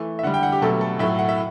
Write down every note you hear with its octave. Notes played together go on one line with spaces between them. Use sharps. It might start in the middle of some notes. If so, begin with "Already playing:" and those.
Already playing: E3 A3
E5
D3 G3 F#5
G5
F#5
G4
B2 F#3 A3 A4
A4
A2 F#3 A3 E5
F#5
E5